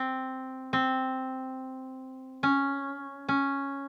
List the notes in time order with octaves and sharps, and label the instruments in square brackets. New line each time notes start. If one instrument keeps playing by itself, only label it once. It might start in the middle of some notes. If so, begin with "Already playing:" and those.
Already playing: [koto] C4
C4
C#4
C#4